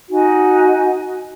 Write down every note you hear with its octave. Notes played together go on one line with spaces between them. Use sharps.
D#4 F#4 G#5